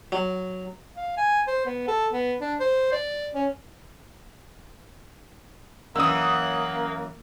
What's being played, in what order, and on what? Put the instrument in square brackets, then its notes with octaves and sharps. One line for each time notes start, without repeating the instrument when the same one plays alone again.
[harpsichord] F#3
[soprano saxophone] F5
G#5
C5
B3
A4
B3
D4
C5
D5
C#4
[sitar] F#2 D3 E3 [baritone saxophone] A#3 [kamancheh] F#5 [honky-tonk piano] D#6 E6